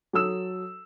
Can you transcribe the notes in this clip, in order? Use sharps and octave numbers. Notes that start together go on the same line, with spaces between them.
F#3 A4 D#6 E6 E7